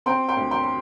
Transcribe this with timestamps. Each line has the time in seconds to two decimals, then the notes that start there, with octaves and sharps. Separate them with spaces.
0.06 C4 G5 C6
0.29 G5 C6
0.36 D2
0.51 G5 C6
0.64 C6